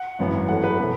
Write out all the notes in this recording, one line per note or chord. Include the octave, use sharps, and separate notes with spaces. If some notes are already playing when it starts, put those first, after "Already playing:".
Already playing: F#5
G#1 F#2 E3 B3
F#2 E3 A3 F#5
B4
B2 A3